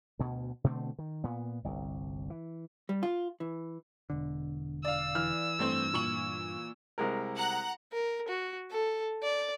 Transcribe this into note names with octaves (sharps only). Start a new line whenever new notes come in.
D2 B2
B2 D3 A3 C4
D#3
A#2 B3
G1 C2
E3
G3
F4
E3
E1 D3
D5 F5 E6
E3 F6
G2 A3 C4 C5
A#2 C#6 F#7
C2 G#3 A#4
F#5 A#5 F#6
A#4
F#4
A4
D5